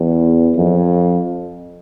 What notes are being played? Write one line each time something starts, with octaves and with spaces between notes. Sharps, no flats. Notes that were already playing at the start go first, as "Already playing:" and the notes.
Already playing: E2
F2